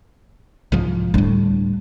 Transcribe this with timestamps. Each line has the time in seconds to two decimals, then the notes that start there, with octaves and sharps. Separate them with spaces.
0.72 C2 G#2 F3
1.14 D2 A2 G3 D4